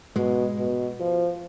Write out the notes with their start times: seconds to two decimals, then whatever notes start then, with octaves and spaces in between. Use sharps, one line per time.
0.16 G#2 B2 G#3
0.58 B2
1.00 F3